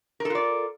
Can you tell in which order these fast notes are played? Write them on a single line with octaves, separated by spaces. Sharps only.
A#4 A4 F4 D5